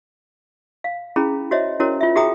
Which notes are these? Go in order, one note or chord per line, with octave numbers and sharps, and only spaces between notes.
F5
C#4 E4 G#4 B5
F#4 C5 C#5 D#5 E5
C#4 E4 F#4 A#4 C#5
F4 E5
F#4 G#4 E5 G5 A#5 D#6